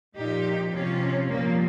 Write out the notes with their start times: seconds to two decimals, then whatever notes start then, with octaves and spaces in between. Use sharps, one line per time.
0.15 A#2 F3 D#4 G4
0.72 C3 F3 C#4 F4
1.28 A#2 F3 G3 A#3